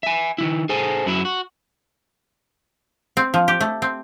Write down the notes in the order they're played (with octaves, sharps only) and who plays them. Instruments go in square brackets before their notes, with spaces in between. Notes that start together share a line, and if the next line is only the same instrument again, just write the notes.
[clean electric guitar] E5 G#5
D#3 E3 E4
G#4 A4 C5 G#5
F#2 F#3 E4
F#4
[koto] C4
F3
G4
A3
C4